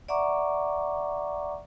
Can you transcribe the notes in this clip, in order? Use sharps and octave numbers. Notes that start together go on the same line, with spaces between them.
D5 E5 F#5 A#5 C#6 D6